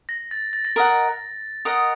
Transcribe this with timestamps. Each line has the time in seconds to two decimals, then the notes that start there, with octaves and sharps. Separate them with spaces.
0.09 A#6
0.31 A6
0.53 A6
0.65 A#6
0.76 A#4 D#5 F#5 A6
1.65 A#4 D#5 F#5 D#6